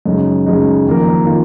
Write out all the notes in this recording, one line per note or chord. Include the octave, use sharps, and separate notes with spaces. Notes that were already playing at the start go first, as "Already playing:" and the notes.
F#2 C#3 G#3 D#4
F#2 C#3 G#3 D#4
F2 D#3 A#3 F4 A#4
D#3 A#3 F4 A#4